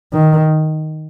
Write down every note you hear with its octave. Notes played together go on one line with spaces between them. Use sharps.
D#3